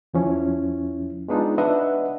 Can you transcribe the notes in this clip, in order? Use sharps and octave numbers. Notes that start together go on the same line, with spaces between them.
E2 F3 C#4 E4
G#3 B3 D4 D#4 F4
D4 B4 D#5 E5 F#5